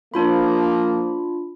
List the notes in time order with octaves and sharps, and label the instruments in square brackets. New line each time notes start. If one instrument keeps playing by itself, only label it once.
[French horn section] F3 A#3 [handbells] D4 F4 B5